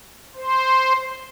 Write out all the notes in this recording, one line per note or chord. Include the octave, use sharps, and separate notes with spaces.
C5